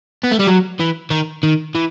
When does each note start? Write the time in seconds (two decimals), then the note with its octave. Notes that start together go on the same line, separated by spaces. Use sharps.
0.23 B3
0.31 A3
0.39 G3
0.47 F#3
0.79 E3
1.10 D#3
1.43 D#3
1.75 E3